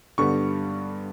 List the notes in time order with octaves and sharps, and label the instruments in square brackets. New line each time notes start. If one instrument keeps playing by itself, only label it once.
[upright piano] G2 D3 G3 B3 C#6